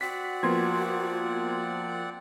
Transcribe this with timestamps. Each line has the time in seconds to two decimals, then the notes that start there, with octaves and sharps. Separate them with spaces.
0.01 C4 F#4 D5 F#5 B6
0.43 F3 A#3 B3 C6 G#6